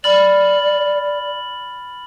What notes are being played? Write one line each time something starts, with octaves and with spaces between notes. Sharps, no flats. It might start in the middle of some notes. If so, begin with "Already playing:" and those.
D5 B5 F6 A6 F#7